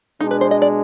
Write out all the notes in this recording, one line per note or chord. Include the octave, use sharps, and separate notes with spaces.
B2 G#3 D4 D#4
B4
C5
D#5
D5